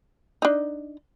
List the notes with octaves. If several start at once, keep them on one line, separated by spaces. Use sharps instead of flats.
D4 D#4